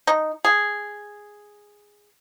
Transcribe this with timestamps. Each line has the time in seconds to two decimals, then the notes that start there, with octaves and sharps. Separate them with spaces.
0.07 D#4
0.45 G#4